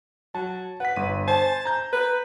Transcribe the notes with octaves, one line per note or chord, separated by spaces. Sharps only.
F#3 A5
B4 F#5 B6
G1 D#7
C5 G#5 A5
A#5 G6
B4